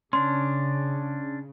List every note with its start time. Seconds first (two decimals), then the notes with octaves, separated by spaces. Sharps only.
0.13 C#3 C#4 D4 C6